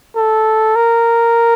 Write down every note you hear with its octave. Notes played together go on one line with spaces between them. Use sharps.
A4
A#4